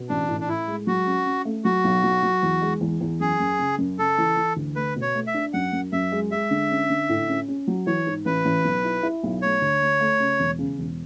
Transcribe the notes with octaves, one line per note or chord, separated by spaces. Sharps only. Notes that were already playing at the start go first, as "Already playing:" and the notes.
Already playing: B2
A1 D4
A2
D4
A2 E4
G#3
F#3 F#4
C#4
C#4
A3
F#3 F#4
B1
F#3
F#3
E2
G#3
E2
E2
F#2 G#4
F#2
C#3
F#2
C#3 A4
E3
E3
D2
A3 B4
B2
C#5
A3
E5
D4
F#2 F#5
F#2
F#2 E5
G#3
G#3 E5
D3
C#4
D3
A2
C#4
C#4
F#3
E3 C#5
G#2
A1 B4
A1
B1
E4
E4
B1
A3 C#5
D2
A3
A3
C#3
E1
C#3
E1